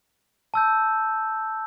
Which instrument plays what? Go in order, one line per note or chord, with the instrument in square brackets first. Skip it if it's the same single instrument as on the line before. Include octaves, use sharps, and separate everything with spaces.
[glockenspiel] A5 E6 G6